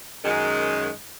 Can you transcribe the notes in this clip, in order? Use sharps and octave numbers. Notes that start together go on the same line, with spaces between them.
F#2 D#3 G#3